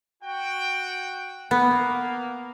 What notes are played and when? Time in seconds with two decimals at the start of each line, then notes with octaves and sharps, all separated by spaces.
0.23 F#4 G5
1.51 A#3 B3